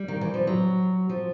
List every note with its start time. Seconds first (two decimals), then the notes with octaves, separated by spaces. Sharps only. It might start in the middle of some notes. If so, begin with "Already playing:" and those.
Already playing: G3
0.08 D#3
0.21 E3
0.34 F3
0.47 F#3
1.09 F3